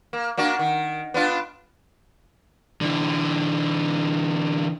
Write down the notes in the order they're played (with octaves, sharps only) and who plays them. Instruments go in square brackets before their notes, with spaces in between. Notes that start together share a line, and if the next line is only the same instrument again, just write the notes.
[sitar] A#3
A#3 D4 F#4
D#3
B3 D4 F4
[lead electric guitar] D3 E3